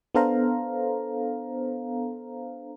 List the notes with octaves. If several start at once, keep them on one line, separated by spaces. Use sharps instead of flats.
B3 D4 A4 C5 F5 A#5